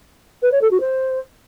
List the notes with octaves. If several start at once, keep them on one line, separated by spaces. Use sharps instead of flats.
B4
C#5
A4
F#4
C5